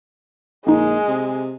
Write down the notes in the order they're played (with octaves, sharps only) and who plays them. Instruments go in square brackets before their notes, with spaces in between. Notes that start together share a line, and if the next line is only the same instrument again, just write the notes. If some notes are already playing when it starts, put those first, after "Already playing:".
[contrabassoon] A#1 [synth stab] D3 D#4 [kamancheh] G#3
[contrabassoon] C3